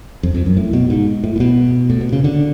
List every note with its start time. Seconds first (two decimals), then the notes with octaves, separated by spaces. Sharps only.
0.23 F2
0.34 F2
0.46 F#2
0.57 A2
0.73 B2
0.90 G#2
1.24 A2
1.36 A2
1.40 B2
1.90 A2
2.01 B2
2.13 C#3
2.24 D3